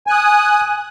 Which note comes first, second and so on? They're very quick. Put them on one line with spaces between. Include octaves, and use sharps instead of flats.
G#5 F#6 D#6